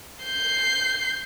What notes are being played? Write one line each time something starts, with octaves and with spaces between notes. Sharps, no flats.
G6 C7